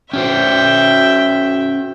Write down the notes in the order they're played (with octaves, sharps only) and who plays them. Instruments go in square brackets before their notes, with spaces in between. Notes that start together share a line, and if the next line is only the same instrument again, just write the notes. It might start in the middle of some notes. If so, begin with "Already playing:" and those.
[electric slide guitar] C#4 F#4 C5 [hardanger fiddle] E5 G5